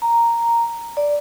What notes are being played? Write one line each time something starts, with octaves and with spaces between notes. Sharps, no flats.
A#5
D5